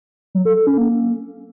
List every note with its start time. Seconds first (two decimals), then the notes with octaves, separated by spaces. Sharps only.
0.35 F#3
0.45 A4
0.56 A4
0.67 C#4
0.78 A#3